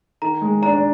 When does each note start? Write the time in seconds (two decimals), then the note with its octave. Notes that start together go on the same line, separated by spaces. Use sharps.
0.22 D#3 A#5
0.42 G#3
0.62 D4 A#5
0.73 D4